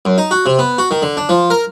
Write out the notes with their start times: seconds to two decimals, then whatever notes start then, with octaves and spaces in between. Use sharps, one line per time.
0.05 F#2
0.18 D#4
0.31 F#4
0.46 C3
0.59 B3
0.78 F#4
0.91 D#3
1.02 D3
1.17 D4
1.29 F3
1.50 A#4